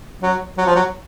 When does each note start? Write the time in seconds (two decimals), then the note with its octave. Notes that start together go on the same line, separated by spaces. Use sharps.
0.23 F#3
0.58 F#3
0.66 F3
0.76 F#3